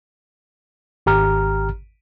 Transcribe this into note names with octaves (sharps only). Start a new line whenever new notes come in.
G#1 G4 A#5 F6